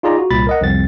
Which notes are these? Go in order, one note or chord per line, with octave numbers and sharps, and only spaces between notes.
D#4 F4 G#4 D5 A#5
F#4
C2 A#2 B5 A6
A#4 D#5 F#5
C2 F2 C4 A6